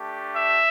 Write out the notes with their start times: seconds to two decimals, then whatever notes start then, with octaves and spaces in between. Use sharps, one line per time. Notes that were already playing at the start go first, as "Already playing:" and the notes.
Already playing: A3 D4 G4
0.35 E5